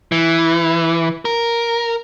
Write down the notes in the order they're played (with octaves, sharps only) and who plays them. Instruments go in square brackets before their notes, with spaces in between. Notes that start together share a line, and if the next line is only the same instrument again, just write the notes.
[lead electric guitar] E3
A#4